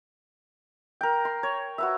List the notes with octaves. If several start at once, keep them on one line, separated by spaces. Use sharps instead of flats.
A#4 G5
C6
C#5
F#4 B4 E5